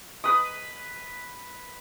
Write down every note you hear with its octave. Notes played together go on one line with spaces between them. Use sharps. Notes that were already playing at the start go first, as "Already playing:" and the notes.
B4 D#6